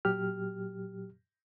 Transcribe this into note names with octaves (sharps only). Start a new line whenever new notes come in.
A#2 F#3 G4 F6